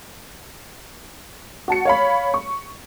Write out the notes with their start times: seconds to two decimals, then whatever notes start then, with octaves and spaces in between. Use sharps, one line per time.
1.68 F#4 A5 C#7
1.85 C#5 F5 B5
2.34 C#6